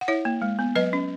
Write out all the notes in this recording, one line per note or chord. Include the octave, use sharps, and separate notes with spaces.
F#5
E4 C#5 E5
A#3
G#3
B3
F#3 B4 D#5
C#4